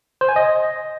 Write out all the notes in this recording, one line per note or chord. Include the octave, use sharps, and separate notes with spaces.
C5
G#5
D#5